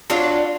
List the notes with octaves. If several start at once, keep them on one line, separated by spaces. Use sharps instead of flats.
F#3 D4 F4